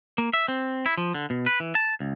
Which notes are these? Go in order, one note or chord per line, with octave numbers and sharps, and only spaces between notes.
A#3
E5
C4
E4
F3
D3
B2
B4
E3
A5
C#2